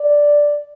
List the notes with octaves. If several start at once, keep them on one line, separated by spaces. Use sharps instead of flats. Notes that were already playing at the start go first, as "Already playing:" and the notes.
Already playing: D5